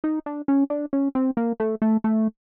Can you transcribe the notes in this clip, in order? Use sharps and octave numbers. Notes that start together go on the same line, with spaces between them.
D#4
D4
C#4
D4
C#4
C4
A#3
A3
A3
A3